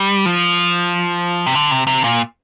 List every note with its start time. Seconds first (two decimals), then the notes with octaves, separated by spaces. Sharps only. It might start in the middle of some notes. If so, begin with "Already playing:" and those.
Already playing: G3
0.26 F3
1.47 C3
1.55 D3
1.71 C3
1.87 C3
2.04 A#2